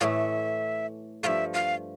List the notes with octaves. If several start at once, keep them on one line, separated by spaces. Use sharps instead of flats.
A2 E3 A3 E5 F5
G2 F3 A3 E5 F5
F5